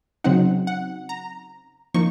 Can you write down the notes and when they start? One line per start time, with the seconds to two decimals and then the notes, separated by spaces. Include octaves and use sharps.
0.24 C#3 F#3 C4 D#4 F#5
0.67 F#5
1.09 A#5
1.94 F3 A#3 D#4 C#6